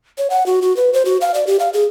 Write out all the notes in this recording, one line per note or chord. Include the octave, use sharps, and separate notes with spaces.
C#5
F#5
F#4
F#4
B4
C5
F#4
F5
D5
G4
F5
G#4